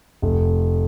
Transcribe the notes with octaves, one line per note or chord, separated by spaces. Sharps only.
F1